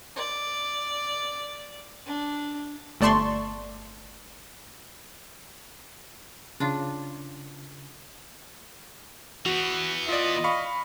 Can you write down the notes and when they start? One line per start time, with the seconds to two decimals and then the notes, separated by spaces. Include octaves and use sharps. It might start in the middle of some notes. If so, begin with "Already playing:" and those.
0.16 D5
2.06 D4
3.01 G1 A3 D5 A5 C6 C#6
6.60 C#3 D4 F4
9.46 E3 B3 F#4
10.09 F4 D5 D#5
10.44 F5 B5 C#6